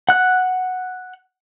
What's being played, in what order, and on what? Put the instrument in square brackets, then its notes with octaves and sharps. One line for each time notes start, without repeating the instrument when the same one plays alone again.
[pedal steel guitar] F#5 F#6